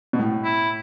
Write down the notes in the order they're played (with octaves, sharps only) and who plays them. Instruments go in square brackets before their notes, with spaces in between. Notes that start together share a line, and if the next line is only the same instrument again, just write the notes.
[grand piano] B2
A2
[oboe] E4